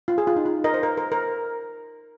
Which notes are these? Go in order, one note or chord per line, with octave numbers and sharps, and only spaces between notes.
F4
G#4
F4
D#4
F4
A#4 D#5
C5
A#4
A#4
A#4